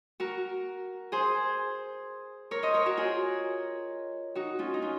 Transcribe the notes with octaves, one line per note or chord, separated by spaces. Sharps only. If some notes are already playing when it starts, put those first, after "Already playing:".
F#4 A#4
G#4 C5
A#4 C#5
C5 D#5
A#4 C#5
F#4 A#4
F4 G#4
D#4 F#4
C#4 F4
D#4
C#4 F4